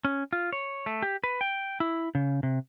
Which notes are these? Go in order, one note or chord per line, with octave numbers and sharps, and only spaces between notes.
C#4
F4
C#5
A3
G4
B4
G5
E4
C#3
C3